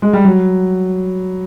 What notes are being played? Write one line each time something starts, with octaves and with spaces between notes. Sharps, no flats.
G#3
G3
F#3